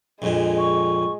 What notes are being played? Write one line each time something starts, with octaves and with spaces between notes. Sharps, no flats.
A#1 F2 A#2 G#3
C#6